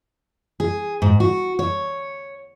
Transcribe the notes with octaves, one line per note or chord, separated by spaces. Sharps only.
G#4
G#2
F#4
C#5